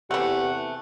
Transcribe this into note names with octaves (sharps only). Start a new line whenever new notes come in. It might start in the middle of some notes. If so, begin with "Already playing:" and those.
E2 C3 E3 A3 G4 F#5